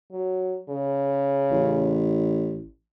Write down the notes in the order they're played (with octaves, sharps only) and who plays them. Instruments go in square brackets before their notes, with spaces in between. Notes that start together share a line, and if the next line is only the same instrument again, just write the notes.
[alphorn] F#3
C#3
[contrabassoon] A1